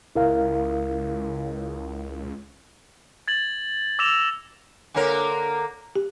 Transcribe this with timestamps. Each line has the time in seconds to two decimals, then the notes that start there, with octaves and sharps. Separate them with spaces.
0.15 C#2 E4 A#4 F5
3.28 G#6 A6 F#7
3.99 D6 E6 A#6 E7 F7
4.94 D3 A#3 A#4 C#5 G#5
5.96 G4